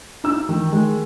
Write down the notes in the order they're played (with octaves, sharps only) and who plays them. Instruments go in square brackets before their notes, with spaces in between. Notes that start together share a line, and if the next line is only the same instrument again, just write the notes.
[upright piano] D#4 E6
D#3
G#3